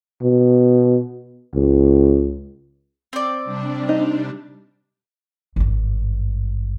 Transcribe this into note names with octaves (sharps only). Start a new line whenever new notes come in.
B2
C#2
C4 D5
C3 G3 D4
D#4
G#1 G2